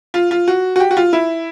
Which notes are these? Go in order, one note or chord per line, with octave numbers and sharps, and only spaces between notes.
F4
F4
F#4
F#4
G4
F#4
F4
E4